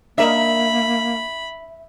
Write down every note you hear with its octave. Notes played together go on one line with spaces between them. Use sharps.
A#3 D4 A#4 D#5 E5 B5